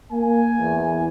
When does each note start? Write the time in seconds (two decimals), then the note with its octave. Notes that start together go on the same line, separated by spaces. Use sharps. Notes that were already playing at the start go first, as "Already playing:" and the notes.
0.11 A#3 G#5
0.59 E2